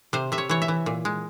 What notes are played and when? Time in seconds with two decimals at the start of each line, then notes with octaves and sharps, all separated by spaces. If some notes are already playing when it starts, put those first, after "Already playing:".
0.13 C3 C5
0.32 C3 E5
0.38 C#5
0.49 E3 C#5
0.62 E5
0.68 E3
0.86 A#2
1.05 G#3